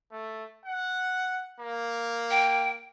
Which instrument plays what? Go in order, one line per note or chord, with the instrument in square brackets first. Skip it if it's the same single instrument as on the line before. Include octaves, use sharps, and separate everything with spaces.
[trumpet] A3
F#5
A#3
[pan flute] G5